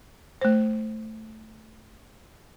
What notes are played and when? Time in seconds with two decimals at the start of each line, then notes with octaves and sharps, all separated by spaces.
0.41 A3 C5